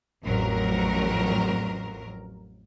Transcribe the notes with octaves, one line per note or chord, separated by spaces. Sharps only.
A1 F2 F#3 A#4